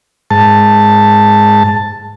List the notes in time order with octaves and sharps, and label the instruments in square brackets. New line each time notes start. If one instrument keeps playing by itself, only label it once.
[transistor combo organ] G#2 A5